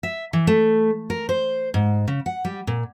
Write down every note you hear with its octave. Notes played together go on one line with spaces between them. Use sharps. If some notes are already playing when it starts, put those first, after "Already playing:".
E5
E3
A3
A#4
C5
G#2
C#3
F#5
G3
A#2